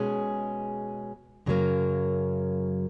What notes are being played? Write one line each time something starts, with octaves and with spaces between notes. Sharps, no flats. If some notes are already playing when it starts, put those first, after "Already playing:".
Already playing: B2 G#3 C#4 G#4
F#2 C#3 F#3 A#3